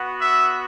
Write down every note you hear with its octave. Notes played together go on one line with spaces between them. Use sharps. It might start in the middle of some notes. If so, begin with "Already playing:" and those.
Already playing: B3 F#4
E5